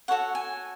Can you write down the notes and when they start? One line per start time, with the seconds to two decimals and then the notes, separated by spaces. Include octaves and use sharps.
0.08 F#4 A4 C#5 F#5
0.35 G#5